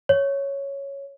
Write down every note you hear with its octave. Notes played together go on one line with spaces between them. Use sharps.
C#5